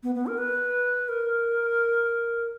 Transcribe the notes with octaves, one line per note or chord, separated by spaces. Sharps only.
B3
B3
A#4
B4
A#4